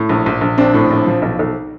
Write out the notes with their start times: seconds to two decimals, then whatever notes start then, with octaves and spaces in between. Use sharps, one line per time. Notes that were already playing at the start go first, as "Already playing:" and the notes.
Already playing: A2
0.09 A#1
0.26 A#1
0.41 A#1
0.58 A#1 C4 D4
0.74 A2
0.91 A#1
1.07 F3
1.22 B1
1.39 B1